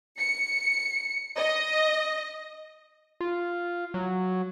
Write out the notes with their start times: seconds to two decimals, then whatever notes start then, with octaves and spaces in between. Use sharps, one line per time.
0.20 C#7
1.37 D#5
3.21 F4
3.94 F#3